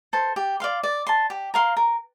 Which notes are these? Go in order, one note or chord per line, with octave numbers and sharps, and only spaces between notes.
A4 C5
G4
D5 F5 C6
D5
A5 C6
G4
A#4 F5 C6
A#4